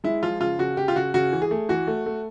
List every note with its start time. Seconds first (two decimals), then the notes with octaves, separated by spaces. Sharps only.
0.04 G#3 E4
0.23 F3 F4
0.41 C#3 F4
0.59 C#3 F#4
0.77 C#3 G4
0.88 F4
0.96 C#3 F#4
1.14 C#3 F#4
1.33 E3
1.42 G#4
1.51 A3
1.69 E3 F#4
1.87 A3
2.06 A3